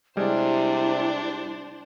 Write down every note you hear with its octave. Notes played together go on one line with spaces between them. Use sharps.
C3 G3 G#3 D4 E4 C5